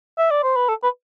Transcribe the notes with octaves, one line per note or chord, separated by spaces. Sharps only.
E5
D5
C5
B4
A4
B4